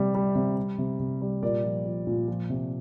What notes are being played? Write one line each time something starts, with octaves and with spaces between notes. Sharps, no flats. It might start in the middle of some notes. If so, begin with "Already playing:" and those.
Already playing: C3 G3
G3
C3
G3
C3
C3
G3
A#2 A#4 D5
F3
F3
A#2
F3
C3